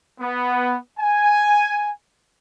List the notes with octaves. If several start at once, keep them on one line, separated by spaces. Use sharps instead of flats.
B3
G#5